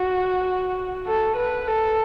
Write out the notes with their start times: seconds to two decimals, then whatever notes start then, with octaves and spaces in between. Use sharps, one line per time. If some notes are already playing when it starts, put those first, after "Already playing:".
Already playing: F#4
1.06 A4
1.36 B4
1.67 A4